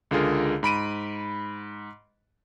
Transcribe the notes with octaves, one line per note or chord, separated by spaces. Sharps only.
C#2 D3 F4 G#4 A#4
G#2 B5 D7 D#7